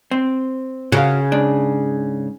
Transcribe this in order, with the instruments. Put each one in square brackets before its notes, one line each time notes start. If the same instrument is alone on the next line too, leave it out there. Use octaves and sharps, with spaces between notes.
[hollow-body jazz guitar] C4
[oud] C#3 [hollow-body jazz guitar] F#4 A#4 F5
[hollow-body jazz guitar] G#2 D4